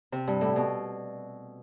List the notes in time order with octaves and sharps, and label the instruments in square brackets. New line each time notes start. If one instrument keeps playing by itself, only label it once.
[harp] C3
G2
A2
B2